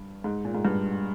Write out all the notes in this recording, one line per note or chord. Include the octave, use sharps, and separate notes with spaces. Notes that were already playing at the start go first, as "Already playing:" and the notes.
Already playing: G2
G#2
A#2
G#2
G2